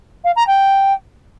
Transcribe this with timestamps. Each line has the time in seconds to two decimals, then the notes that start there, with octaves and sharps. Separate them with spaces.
0.24 F5
0.35 A#5
0.47 G5